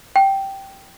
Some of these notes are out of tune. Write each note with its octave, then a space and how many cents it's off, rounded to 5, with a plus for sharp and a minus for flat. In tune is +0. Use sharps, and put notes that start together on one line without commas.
G5 -10